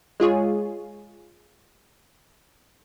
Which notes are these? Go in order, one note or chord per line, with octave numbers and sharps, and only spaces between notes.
G#3 F4 G#4 C#5